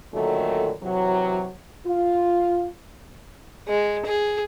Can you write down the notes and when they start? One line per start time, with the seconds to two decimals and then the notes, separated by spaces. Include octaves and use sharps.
0.14 A#2 D3 D#3 F#3 A3
0.83 C3 E3 F#3
1.86 F4
3.68 G#3
4.06 G#4